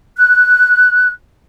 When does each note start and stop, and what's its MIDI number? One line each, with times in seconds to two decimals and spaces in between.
0.17 1.11 90